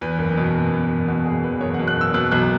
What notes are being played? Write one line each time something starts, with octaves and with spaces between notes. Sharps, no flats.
E2 B4
F#1
B2
F#1
E2
F#1
B2 F#4
F#1 G#4
E2 B4
F#1 C#5
F#5
B2
F#6
F#1 E6
B2 F#6
B1 F#6